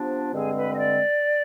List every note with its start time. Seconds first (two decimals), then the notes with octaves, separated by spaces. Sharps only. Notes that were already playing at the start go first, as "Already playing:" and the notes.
Already playing: C3 F3 B3 D4
0.33 G2 D3 G#3 C4 G#4
0.56 B4
0.73 D#5
0.78 D5